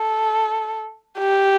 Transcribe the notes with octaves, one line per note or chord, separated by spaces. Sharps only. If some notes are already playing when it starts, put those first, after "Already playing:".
Already playing: A4
G4